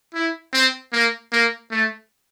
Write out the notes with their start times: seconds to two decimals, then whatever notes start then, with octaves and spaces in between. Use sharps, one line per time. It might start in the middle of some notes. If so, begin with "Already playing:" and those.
0.14 E4
0.53 C4
0.93 A#3
1.32 A#3
1.71 A3